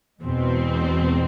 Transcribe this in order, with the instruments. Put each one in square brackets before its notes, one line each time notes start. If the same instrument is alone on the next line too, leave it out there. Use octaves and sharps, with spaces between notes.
[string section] E2 B2 G#3 C4